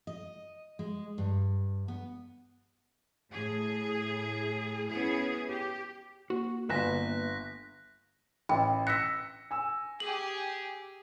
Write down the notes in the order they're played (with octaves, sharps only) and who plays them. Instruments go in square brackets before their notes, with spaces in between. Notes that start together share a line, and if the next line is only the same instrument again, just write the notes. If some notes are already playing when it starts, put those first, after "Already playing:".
[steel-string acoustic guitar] D#5
G#3
G2
B3
[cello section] A2 G#4
B3 C#4 E4 G#4
G4
[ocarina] A#3 [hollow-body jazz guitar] F#4
[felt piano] G1 [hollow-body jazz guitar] B4 E5 G#5 [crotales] F#6 A#6 B6
[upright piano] A1 [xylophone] D#5 G5 B5
[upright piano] E6 A#6 C#7 [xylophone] F#6 B6
[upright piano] G#5 E6
[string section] G4 G#4 [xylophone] F#7